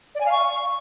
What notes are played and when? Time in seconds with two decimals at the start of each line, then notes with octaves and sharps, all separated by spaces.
0.15 D5
0.20 G#5
0.26 F5
0.31 C#6